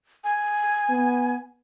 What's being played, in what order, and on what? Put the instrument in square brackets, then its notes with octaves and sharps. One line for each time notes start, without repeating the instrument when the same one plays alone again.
[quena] G#5
[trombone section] B3